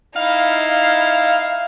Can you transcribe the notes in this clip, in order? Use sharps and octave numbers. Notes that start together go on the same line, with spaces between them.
D#4 E4 F5